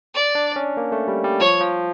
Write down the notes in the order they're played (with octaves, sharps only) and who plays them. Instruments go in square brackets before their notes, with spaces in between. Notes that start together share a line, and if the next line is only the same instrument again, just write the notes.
[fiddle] D5
[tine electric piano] D4
C#4
A#3
A3
G3
G3
[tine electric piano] F3 [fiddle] C#5
[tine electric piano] F3